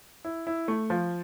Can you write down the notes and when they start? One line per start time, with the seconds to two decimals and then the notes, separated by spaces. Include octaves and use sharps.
0.25 E4
0.47 E4
0.68 A3
0.90 F3